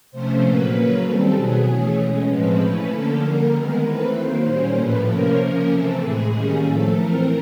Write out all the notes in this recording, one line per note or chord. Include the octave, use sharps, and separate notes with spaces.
C3 F3 A3 C#4 C5
A#2 F#3 A#3 B4
C#3 F#3 A#3 C#4
D#3 G3 C4 A4
B2 F#3 B3 G#4
E3 A3 C#4
B2 G#3 C#4
A2 F3 G#3 C4 B4
E3 A3 C#4
D3 F3 A#3 C#4 A4
D3 G3 A#3 A#4
D#3 G#3 B3
E3 A3 C4 B4
D#3 F#3 A#3 C5
A#2 G3 A#3 C#4
A2 F3 A3 B4
C3 F3 A#3 C#4 A#4
C#3 F3 A#3 C#4
C3 E3 A3 C4 A4
A2 E3 G#3 G#4
D#3 G3 A#3 C#4 G#4
A2 F3 A3 A4
E3 A3 C4 A#4